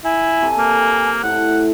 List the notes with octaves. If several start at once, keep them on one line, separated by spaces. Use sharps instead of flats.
E4 G#5
C3 A4
A#3
A2 F#5